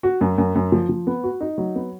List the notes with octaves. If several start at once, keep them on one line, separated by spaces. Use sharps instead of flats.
F#4
F#2
F#2
F#2
F3
F3
B3
F#4
D#4
F#3
B3